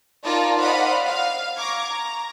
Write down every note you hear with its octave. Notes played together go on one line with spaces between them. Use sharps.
D#4 F4 A#4 D5 A5 A#5
C5 D5 D#5 F5 F#5 B5
F5
A#5 C#6 D6 G#6
A#5